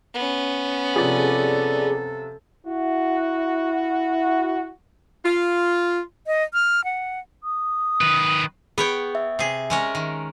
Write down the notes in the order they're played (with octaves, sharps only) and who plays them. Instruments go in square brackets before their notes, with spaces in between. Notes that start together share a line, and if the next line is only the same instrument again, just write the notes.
[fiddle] B3 C#4
[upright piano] C3 F3 [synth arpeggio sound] G#4 D5 [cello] A4
[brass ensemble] E4 F#4
[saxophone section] F4
[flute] D#5
F6
F#5
D#6
[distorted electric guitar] D#3 B4
[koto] B3 C#5 G5 [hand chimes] G#4
[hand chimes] E5
[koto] C3 G#4
G#3 C#4 A#4
D#3